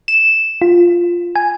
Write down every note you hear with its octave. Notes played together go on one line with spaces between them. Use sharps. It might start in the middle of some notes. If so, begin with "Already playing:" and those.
E7
F4
G#5